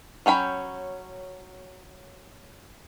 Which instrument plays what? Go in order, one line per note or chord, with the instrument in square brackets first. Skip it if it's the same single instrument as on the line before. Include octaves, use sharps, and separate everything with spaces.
[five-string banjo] F#3 C#4 G5 B5